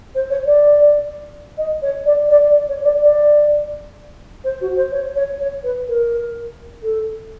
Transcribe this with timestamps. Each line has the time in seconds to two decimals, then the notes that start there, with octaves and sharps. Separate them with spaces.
0.15 C5
0.30 C#5
0.46 D5
1.57 D#5
1.82 C#5
2.05 D5
2.29 D5
2.69 C#5
2.81 C#5
2.85 D5
3.01 D5
4.44 C5
4.61 F#4
4.76 C5
4.91 C#5
5.16 C#5
5.40 C#5
5.63 B4
5.88 A#4
6.83 A4